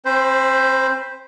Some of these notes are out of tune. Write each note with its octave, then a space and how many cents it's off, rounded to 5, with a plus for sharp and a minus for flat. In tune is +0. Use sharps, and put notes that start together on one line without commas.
C4 +35 C5 +0 B5 -10